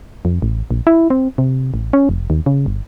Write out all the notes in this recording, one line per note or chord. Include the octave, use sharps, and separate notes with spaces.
F2
A1
A#1
E4
C4
C3
A1
C#4
F1
D#2
C#3
G1